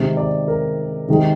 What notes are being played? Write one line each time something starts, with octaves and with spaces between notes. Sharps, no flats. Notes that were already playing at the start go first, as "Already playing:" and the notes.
Already playing: C3 D#3 G#3
D5
A#4
C3 D#3 G#3